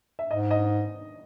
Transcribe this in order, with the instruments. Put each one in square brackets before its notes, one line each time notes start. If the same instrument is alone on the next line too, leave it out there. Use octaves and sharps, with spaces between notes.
[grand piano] E5
[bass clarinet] G#2 [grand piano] D#5
[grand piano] D#5